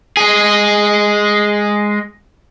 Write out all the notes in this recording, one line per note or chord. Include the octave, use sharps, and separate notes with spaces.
G#3 G#4